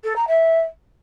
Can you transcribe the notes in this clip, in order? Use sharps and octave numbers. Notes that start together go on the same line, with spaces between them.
A4
A#5
E5